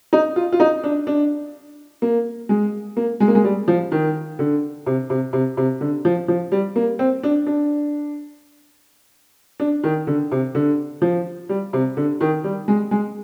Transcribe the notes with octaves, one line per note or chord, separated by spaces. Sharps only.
D#4
F4
F4
D#4
D4
D4
A#3
G#3
A#3
G#3
A#3
G#3
G3
F3
D#3
D3
C3
C3
C3
C3
D3
F3
F3
G3
A#3
C4
D4
D4
D4
D#3
D3
C3
D3
F3
G3
C3
D3
D#3
G3
G#3
G#3